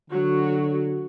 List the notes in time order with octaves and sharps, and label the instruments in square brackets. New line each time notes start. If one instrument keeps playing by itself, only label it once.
[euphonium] D3 [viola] F#3 F#4